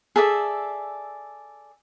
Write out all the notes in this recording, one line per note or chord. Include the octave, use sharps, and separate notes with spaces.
G#4 A4 D5 E5